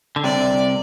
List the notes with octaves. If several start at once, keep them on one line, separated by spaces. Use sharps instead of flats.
D3
C2 C3 D5